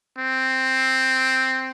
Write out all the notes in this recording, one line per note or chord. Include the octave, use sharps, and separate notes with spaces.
C4